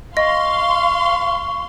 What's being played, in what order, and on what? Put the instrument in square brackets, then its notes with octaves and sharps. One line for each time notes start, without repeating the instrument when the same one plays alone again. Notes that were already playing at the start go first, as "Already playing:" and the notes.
[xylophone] D#5 [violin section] F5 C6 [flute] C#6